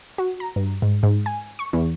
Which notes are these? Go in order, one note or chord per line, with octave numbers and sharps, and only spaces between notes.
F#4
A#5
G2
G#2
G#2
G#5
C#6
E2